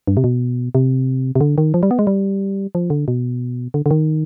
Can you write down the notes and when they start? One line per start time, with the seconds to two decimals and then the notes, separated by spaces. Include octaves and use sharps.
0.07 G2
0.17 C3
0.24 B2
0.75 C3
1.35 C3
1.41 D3
1.58 D#3
1.74 F3
1.83 G3
1.91 B3
1.99 G#3
2.07 G3
2.75 F3
2.90 D3
3.08 B2
3.74 D3
3.86 D3
3.91 D#3